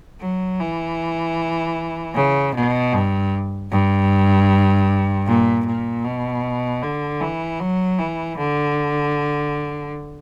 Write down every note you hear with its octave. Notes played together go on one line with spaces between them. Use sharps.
F#3
E3
C#3
B2
G2
G2
A#2
A#2
B2
D3
E3
F#3
E3
D3